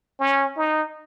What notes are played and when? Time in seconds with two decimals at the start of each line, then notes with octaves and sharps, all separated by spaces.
0.20 C#4
0.57 D#4